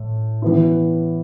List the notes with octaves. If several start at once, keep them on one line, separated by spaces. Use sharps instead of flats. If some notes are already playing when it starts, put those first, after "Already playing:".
Already playing: A2
E3 B3 E4